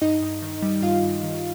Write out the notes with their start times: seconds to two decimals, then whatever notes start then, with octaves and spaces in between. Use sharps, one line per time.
0.01 G2 D#4 D#5
0.22 G2
0.42 D#3
0.62 G3
0.82 G2 F4 F5
1.03 G2
1.23 D#3